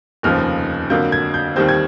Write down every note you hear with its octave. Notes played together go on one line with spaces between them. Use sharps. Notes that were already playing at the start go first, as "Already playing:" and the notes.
F1 D#2 C#3 F3 F6
F2 D3 F#3 A#3 G6
G#6
G6
D#2 D#3 G3 C4 G6
G#6